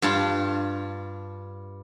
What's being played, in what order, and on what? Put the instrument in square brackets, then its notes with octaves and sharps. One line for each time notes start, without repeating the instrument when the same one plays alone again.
[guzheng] G2 F4 A5